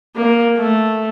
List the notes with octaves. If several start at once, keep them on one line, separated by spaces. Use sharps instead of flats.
A#3
A3